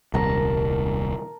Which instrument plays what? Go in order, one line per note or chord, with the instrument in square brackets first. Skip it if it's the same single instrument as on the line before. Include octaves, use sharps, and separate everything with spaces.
[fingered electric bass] D#1 C2 [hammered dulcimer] A#4 A5